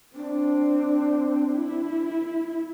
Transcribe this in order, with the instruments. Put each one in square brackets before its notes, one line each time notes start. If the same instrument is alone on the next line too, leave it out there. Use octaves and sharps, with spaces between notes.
[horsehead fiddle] C4 [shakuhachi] D4
[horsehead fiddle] E4